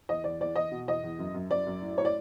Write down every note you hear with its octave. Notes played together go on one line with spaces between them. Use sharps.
E2 D#5
E2 D5
E2 D5
E2 D#5
B2
E2 D#5
E2
F#2
F#2
F#2 D5
F#2
A2
A2 C#5
D5